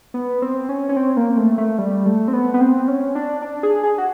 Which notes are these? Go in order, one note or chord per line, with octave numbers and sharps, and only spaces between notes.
B3
C4
C#4
C#4
C4
A#3
A3
A3
G3
A3
C4
B3
B3
C4
C#4
D4
D4
G#4
G#4
F#4